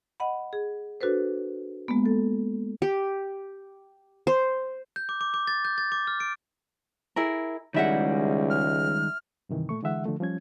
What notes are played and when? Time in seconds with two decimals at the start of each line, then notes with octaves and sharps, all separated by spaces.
0.20 D#5 F#5 B5
0.53 G#4
1.01 D4 F#4 A4 B4 C5
1.88 G#3 A#3 B3
2.06 A4
2.82 G4
4.27 C5
4.96 G6
5.09 D6
5.21 D6
5.34 D6
5.47 A6
5.65 G6
5.78 A6
5.92 D6
6.07 F6
6.20 D7
7.16 E4 G#4 A#4
7.74 C#2 D#3 G3 G#3 E4 E5 F#5
8.50 F6
9.49 G2 C3 D#3 E3
9.69 A#2 A3 C#6
9.83 D3 E3 G#3 E5 F#5
10.06 D3 F3 A3
10.20 F3 G3 C#4 G#6